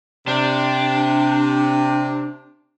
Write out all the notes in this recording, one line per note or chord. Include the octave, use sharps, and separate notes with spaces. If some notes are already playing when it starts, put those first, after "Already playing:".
C3 D4